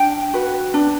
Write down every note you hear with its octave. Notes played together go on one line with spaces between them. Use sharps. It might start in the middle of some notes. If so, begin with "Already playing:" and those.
Already playing: D4 G5
F#4 B4
D4